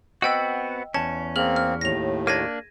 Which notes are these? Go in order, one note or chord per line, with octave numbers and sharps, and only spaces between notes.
B3 C4 F#4 D#5 G5 E6
E2 C#4 A5
A#3 C4 G#4 F6 F#7
F6
D#2 A2 A#6 F7
A#3 D4 G#6 A#6 D#7